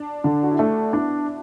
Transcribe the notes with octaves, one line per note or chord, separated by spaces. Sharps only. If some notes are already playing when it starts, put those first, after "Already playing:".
Already playing: D4
D3
F#4
E4
A3 D4
B3 D4 E4